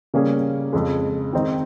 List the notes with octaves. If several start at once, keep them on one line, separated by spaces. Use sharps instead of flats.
C#3 G3 A#3 C#4 G#4
F2 C#3 G#3
D#3 G#3 C4 D#4